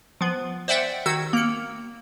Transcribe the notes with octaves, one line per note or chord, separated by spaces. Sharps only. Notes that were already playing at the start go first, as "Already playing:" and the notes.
F3 B3
C5 D5 E5 F#5 G5
D#3 F#4 E6 G#6
A#3 C#7